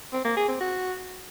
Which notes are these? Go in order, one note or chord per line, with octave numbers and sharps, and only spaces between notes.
C4
A#3
G#4
C4
F#4